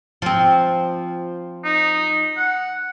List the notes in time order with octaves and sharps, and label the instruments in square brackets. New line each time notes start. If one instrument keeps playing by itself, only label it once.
[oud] F3 C4
[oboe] D#4
F#5